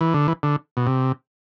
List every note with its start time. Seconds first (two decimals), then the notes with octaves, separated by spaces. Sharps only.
0.01 E3
0.14 D3
0.28 E3
0.43 D3
0.77 B2
0.87 C3